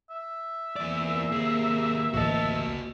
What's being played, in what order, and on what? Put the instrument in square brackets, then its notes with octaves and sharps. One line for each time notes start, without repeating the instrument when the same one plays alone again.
[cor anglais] E5
[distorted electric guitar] E2 D5 [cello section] C3 A#3
[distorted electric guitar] D#2 G#4
[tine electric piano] A1 D2 D#5 [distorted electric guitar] F#4 A5